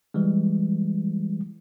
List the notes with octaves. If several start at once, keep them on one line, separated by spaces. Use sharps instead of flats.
E3 G3 G#3